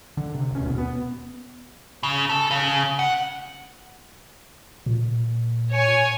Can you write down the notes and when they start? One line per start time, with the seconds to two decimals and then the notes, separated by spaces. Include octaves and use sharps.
0.17 D3
0.35 C3
0.50 D1 C#4
0.64 D#2 B2
0.78 B3
2.03 C#3
2.30 A4
2.51 C#3
2.99 F#5
4.86 A#2
5.72 C#5 G#5